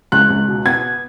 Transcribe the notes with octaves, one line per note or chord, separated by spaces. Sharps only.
C#2 F#6
C#2
B2
B3 G#6